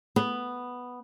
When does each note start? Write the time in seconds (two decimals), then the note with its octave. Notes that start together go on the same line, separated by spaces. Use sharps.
0.16 B3